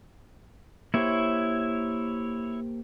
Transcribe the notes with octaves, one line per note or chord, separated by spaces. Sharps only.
A#3 E4 G4 C5 C#5